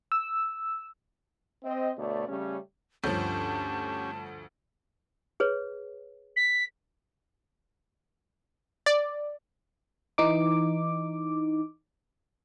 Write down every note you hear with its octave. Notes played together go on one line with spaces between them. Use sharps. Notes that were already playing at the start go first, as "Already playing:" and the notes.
E6
C4 D#5
D2 B2 A3 C#5 D5
C#3 G3 A3 C#4
D2 G2 F3 C#4 G4 C#5 A5 G6
G#4 B4 C#5
B6
D5
E3 D#4 D6